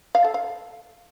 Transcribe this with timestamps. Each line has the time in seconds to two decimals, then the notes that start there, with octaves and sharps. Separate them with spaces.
0.15 F5
0.24 A4
0.34 F5